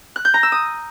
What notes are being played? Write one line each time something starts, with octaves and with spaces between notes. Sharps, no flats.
F#6
G6
A#5
E6
D#6